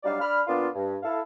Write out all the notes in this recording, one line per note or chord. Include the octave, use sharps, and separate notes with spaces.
F#3 G3 D4 D#4 D5 F5
D4 B5 F6
A#2 B3 D4 F4
G2
E4 A4 F5